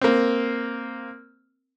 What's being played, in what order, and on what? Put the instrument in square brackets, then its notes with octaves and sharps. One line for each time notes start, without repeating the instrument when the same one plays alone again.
[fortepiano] A#3 C4